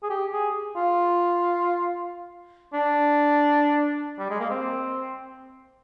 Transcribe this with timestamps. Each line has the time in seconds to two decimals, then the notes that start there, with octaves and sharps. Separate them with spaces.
0.03 G#4
0.10 G4
0.32 G#4
0.76 F4
2.74 D4
4.19 G3
4.30 G#3
4.40 A#3
4.50 C4